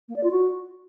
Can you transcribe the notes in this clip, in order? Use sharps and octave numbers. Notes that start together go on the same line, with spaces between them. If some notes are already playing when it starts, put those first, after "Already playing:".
A#3
D5
F4
F#4